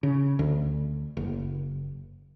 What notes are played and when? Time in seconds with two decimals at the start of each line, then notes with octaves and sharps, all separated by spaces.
0.03 C#3
0.39 D2
1.17 F#1